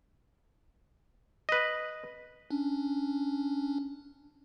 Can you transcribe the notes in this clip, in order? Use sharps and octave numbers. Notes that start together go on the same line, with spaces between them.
B4 D#5
C#4 D4